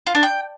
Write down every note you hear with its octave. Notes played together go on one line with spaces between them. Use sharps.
F4
D4
G5